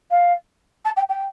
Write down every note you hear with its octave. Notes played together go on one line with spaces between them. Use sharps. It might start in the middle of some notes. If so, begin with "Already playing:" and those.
F5
A5
G5
G5